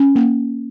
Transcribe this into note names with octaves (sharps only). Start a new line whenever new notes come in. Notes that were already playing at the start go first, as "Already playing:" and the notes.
Already playing: C#4
A#3